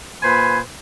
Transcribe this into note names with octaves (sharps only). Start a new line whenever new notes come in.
A#2 B4 C5 G#5 B5